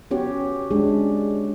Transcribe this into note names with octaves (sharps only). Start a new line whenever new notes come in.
B3 C#4 F#4 G4 C#5
G#3 C#4 D4 G4 G#4